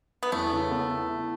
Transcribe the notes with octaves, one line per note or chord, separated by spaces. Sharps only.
B3
E2 A3
C#3
B3
E4
E4